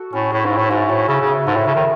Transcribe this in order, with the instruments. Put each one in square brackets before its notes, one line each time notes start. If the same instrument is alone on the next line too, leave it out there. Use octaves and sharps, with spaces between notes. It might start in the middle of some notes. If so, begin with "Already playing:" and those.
Already playing: [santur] F#4 A4
[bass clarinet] A2 [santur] C#4
[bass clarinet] A2 [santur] G#4
[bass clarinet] G#2
[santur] E4
[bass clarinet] A2
[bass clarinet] G#2 [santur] F#3
[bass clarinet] A2 [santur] F#3
[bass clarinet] C#3 [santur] E4
[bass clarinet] C#3
[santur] B3
[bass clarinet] G#2 [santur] A3
[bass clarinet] A2
[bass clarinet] C#3 [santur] A3
[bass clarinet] D#3